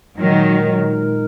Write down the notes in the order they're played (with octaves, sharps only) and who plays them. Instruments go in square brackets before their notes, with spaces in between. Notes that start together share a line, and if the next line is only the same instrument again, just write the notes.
[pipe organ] A#2 G#3 D#4 A#4 [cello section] D#3 F#3